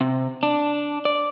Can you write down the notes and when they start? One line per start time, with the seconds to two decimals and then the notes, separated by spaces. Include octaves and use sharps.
0.01 C3
0.43 D4
1.05 D5